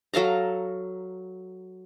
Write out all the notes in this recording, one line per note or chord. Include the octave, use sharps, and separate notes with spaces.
F#3 A4 F5 A#5